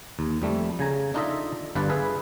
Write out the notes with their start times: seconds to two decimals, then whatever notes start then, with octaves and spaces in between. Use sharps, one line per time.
0.19 D#2
0.42 F2 G3 A3
0.79 C#3 G#5 A#5
1.14 D4 D#4 F4 A4 D#5 E5
1.75 G1 G2 F4 B4 D5 A5
1.90 G#4 B4 E5 F5